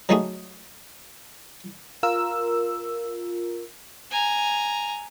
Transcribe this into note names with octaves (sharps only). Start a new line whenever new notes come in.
F#3 G#3 A3 D#4 F#4 G#4
F4 A#4 E6
G#5 A#5